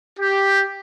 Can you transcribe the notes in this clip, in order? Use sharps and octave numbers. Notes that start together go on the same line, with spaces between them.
G4